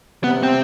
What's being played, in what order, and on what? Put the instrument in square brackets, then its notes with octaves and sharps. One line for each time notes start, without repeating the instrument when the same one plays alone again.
[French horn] C3 [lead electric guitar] B3
[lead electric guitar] C4